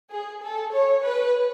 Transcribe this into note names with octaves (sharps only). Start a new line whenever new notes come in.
G#4
A4
C#5
B4